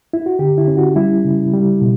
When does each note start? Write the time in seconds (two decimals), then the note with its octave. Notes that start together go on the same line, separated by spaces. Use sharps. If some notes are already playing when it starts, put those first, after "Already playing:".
0.13 E4
0.26 F#4
0.39 D3 G4
0.58 E4
0.68 C#4
0.77 F#4
0.96 G3 E4
1.25 C#3
1.54 G3
1.81 B2